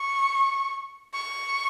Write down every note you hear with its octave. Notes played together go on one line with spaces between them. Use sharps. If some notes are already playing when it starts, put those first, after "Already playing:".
Already playing: C#6
C#6